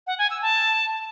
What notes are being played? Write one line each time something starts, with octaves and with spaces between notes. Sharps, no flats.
F#5
G#5
E6
A5